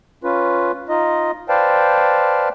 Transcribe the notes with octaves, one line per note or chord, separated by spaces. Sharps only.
C#4 F4 B4
D#4 F4 D#5
B4 C5 D5 F5 G5 A5